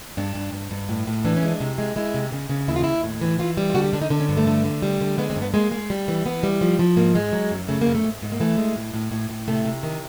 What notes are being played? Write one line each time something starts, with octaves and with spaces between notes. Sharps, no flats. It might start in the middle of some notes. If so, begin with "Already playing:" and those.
G2 D4
G2
G2
G2
A2
A2
E3 D4
C#4
G#3
D4
C3
G#3
G#3 E4
C3
C#3
C#3
D#2 E4
F4
D#2 E4
A2
E3
E3 F4
G3
F4
D3 F#4
G4
D3 D4
D#4
D3 D4
C#4
G2
A3
D3
D3
G3
D3
G#3 B3
C4
G2
B3
G#3 A#3
G#3
G3
E3
E3 B3
G3
F3
F3
G#2 A#3
G#3
F#3
F#2
C#3 A3
A#3
F#2
A3
G#2
G#2
A#3
E3 A3
G#3
A2
A2
A2
A2
C3 A3
C3
D#3